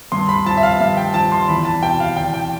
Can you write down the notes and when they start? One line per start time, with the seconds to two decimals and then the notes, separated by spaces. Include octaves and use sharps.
0.12 G2 C6
0.29 B5
0.46 F3 A5
0.57 E5
0.63 F5
0.80 G2 F5
0.97 G5
1.14 F3 A5
1.32 C6
1.48 E2 B5
1.65 A5
1.82 B2 G5
2.00 F5
2.16 E2 G5
2.34 G5